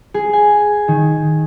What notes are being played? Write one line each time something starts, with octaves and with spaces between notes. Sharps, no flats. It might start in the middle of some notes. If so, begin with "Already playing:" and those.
G#4
G#5
D#3